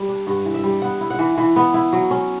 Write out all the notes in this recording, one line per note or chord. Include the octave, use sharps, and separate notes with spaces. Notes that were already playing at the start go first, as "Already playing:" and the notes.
Already playing: G3
D4
G2 F#5
E3
E5
G3
B3 F#5
E4
F#5
E3
E3
B3
E4
F#3
C#4